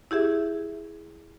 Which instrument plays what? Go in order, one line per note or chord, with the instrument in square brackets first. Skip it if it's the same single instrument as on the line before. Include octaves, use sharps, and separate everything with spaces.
[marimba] E4 G4 G#4 E5